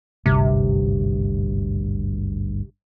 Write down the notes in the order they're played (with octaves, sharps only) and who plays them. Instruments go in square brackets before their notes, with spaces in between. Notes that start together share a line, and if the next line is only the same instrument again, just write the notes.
[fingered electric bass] G#1 D2 G2 [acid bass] C3